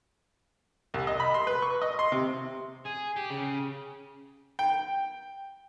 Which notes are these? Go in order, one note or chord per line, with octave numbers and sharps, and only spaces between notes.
C2
D#5
B5
C6
B4
C#6
D#5
C6
C3
G#4
G4
C#3
G5